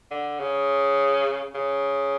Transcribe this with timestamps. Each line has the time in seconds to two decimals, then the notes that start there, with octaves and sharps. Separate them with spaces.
0.11 D3
0.40 C#3
1.54 C#3